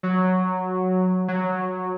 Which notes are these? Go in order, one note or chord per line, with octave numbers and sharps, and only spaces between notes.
F#3
F#3